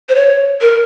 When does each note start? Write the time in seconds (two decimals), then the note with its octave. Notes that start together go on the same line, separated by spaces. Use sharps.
0.09 C5
0.15 C#5
0.61 A#4